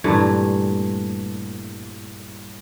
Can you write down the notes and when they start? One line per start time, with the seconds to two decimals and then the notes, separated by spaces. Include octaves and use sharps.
0.04 G2 A#2 E3 A3